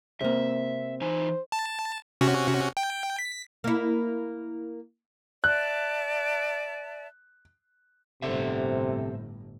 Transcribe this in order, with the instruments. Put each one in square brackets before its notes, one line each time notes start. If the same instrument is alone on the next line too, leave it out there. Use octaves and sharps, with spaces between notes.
[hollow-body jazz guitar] C3 A#3 [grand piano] C4 [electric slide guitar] E5
[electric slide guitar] E3 D#4 G#5 [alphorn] C5
[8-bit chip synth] A5
C3 C#4 F#4
G5
B6
[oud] A#3 E4
[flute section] D5 E5 A5 [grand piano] F#6
[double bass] G1 A2 [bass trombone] C3 [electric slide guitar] A4 C5 E5